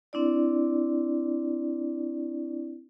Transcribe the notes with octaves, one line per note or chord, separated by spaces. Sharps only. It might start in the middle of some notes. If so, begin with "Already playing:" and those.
C4 D4 E4 D5